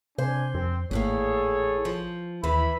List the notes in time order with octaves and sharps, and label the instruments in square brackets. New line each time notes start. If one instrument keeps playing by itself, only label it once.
[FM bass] C3 [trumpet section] D4 G#5 [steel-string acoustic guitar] C5
[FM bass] F2 [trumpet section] C4
[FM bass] G#1 [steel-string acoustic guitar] E2 A2 A#3 [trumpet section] G#4 A4 C#5
[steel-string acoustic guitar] F3
[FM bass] D#2 [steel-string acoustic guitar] E3 [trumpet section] E4 B5